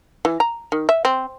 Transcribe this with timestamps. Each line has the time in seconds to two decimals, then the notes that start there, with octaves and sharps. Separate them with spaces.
0.25 E3
0.40 A#5
0.72 D#3
0.89 E5
1.05 C4